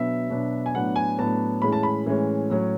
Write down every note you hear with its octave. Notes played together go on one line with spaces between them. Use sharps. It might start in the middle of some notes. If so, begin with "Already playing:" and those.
Already playing: B2 F#3 B3 D4 E5
B2 F#3 B3 D4
G#5
A2 F#3 B3 D4 F#5
G#5
A2 F#3 B3 D4 A5
A2 E3 G#3 C#4 B5
A5
B5
A2 E3 G#3 C#4
A2 F#3 C#4